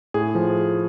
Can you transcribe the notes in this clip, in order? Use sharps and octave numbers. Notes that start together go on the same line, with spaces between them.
A2 G#4
F3